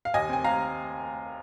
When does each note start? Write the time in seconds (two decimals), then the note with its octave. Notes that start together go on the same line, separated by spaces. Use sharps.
0.05 F5
0.14 D#2 D#5 G#5
0.29 C4 G#5
0.44 D#2 F5 A#5